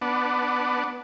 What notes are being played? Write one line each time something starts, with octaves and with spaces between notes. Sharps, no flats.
B3 D4